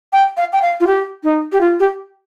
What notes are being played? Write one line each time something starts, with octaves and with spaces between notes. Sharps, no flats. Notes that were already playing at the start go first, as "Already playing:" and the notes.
G5
F5
G5
F5
F4
G4
D#4
G4
F4
G4